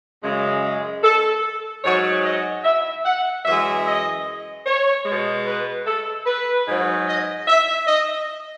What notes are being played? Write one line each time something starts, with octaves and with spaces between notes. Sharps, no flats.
F#2 C#3 G#3
A4
G#2 F#3 C#5
D#5
E5
F#5
F#2 E3 G#3 E5
D#5
C#5
B2 G#3
B4
A4
B4
G#2 F#3
D#5
E5
D#5